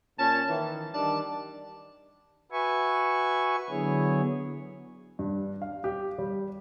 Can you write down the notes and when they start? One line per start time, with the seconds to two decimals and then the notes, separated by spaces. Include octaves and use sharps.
0.17 A#2 C#4 A5
0.47 D#3 E3
0.92 D#3 G3 D4 A5
2.52 F#4 B4 E5 G#5 C#6
3.70 D3 F#3 B3 E4 G#4 C#5
5.19 G2
5.62 F5
5.84 G4
6.18 G3